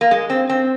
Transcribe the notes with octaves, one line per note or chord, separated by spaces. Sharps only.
A#3
G#3
C4
C4